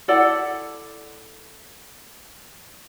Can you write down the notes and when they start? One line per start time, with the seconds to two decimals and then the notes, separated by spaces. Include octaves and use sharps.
0.08 E4 A4 D5 F#5